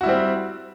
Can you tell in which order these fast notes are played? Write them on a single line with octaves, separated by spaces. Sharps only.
F#4 E4 G3 C4